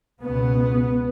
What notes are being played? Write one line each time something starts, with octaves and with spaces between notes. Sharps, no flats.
C#2 B2 B3